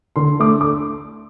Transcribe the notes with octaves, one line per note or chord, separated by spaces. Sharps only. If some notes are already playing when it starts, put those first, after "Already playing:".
D3 C6
A3 D4 D6
D6